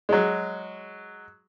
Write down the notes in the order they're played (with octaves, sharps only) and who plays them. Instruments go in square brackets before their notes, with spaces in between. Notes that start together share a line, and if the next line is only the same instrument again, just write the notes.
[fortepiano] F#3 G#3